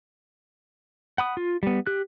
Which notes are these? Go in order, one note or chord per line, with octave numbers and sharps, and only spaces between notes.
F#5 B5 D#6
F4
G3 B3
G4 F#6